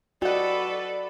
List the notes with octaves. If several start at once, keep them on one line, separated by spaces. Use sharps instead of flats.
F#4 G4 A4 B4 D5 D#5 F#5